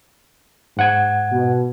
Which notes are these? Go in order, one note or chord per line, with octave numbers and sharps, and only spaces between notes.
G#2 F#5 G#6
B2